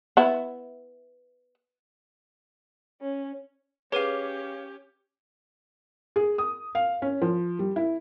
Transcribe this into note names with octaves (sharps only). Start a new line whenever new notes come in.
B3 E4
C#4
C#4 G4 G#4 B4 C#5 F5 D6 D#7
G#4
D#6
F5
C#4
F3
G3
E4